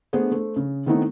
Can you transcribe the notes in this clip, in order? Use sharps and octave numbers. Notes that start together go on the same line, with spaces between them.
A3 B3 D4 G#4 C5
A3 C5
C#3
D#3 A3 B3 C4 D#4 E4